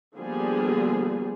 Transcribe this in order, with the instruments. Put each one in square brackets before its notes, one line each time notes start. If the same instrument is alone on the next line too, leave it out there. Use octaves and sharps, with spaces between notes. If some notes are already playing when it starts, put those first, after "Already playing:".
[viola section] D3 F3 G3 A#3 B3 G#4